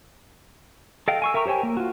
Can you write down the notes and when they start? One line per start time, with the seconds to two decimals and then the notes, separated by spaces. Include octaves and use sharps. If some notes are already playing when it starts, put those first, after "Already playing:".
1.08 A4 D#5 F5 G5
1.22 G#5 C#6 E6
1.34 A#4 E5 G5 A#5 C#6
1.46 G4 C5 C#5 G5 G#5
1.63 A#3
1.77 F4 F#4